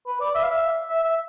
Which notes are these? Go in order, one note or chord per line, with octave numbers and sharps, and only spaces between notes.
B4
D5
E5
F5
E5
E5
E5